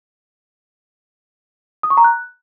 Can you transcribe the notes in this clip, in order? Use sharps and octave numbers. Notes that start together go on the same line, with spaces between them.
D#6
C#6
A#5
F#6